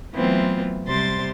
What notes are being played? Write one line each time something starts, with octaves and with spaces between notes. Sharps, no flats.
E3 F#3 A3 B3 C4 F4
C3 G3 G4 C5 C6 A6